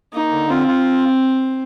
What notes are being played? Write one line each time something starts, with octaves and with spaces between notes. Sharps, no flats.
A#3 D#4
D3
C4 F4
F4